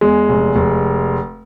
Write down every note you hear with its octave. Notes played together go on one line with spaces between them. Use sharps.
E2 G#3
F1
F1